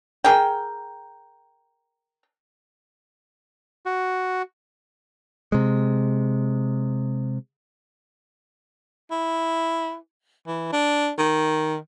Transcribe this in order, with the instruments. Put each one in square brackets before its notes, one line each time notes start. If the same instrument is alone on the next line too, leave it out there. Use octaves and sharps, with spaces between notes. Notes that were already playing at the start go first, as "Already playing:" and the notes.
[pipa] G#4 A#4 G5
[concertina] F#4
[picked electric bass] C3 G#3
[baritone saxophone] E4
E3
D4
D#3